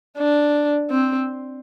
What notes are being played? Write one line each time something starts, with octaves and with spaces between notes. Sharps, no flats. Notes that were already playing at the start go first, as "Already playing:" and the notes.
D4
C4